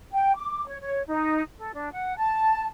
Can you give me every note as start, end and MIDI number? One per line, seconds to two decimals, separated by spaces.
0.13 0.34 79
0.36 0.65 86
0.66 0.76 73
0.81 1.02 73
1.07 1.42 63
1.57 1.72 69
1.73 1.91 62
1.92 2.15 78
2.17 2.66 81